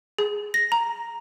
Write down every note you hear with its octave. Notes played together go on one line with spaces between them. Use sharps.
G#4
A#6
A#5